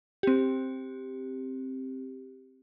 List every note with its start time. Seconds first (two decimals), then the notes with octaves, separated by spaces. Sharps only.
0.23 C4 G4